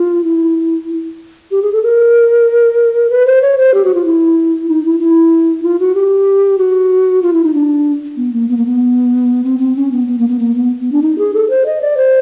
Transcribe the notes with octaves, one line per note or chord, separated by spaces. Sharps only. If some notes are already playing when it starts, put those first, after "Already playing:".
Already playing: F4
E4
G4
G#4
A4
A#4
B4
C5
C#5
C5
G4
F#4
F4
E4
D#4
E4
E4
F4
F#4
G4
F#4
F4
E4
D#4
D4
B3
A#3
B3
A#3
B3
C4
C4
C#4
B3
B3
A#3
B3
A#3
B3
B3
D4
D#4
G#4
A4
C5
D#5
D5
C5